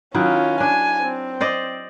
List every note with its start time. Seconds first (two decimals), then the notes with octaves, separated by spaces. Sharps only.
0.14 D#3 F#3 C#4 E4 F4
0.60 D4 G#5
1.01 C4
1.40 C5 D5 D#5